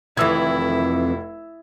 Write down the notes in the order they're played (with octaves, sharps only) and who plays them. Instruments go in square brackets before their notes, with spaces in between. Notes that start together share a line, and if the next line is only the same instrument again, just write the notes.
[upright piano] F1 E6 G#6 [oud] F2 D#3 E3 [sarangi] E4